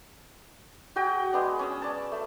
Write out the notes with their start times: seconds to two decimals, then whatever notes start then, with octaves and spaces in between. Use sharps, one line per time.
0.96 F#4 G#4 D#5 G5
1.33 G#3 B3 D4
1.59 C#4 D#6 E6
1.82 D5 A5
2.12 A3